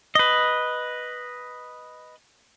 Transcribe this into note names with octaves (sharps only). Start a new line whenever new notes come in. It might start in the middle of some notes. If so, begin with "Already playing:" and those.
B4 D#5